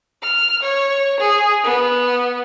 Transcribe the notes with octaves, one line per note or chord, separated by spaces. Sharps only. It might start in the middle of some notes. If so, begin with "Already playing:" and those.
F6
C#5
G#4
B3